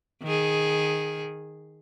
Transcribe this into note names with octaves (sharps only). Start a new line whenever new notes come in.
D#3 G#4